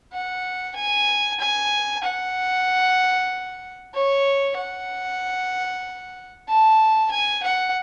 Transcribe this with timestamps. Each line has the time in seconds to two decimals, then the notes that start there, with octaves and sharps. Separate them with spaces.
0.13 F#5
0.76 G#5
1.40 G#5
2.04 F#5
3.95 C#5
4.57 F#5
6.49 A5
7.12 G#5
7.44 F#5